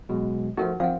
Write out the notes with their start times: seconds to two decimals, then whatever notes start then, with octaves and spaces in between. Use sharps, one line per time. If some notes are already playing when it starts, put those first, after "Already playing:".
0.09 B2 F#3 G#3
0.57 F3 A3 D#4 F#4 A#4 F#5
0.80 F3 C4 F5 F#5